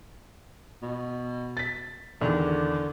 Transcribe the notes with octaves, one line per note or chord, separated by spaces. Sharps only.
B2
A6 B6
E2 D3 D#3